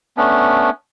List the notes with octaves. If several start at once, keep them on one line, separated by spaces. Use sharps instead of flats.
A3 B3 C#4 D4